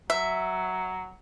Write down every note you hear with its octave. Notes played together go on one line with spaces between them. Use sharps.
F#3 E5